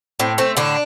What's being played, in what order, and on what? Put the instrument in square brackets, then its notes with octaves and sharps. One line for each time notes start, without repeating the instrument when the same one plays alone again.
[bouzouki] A2 C4
A3 C4
A2 D3 D4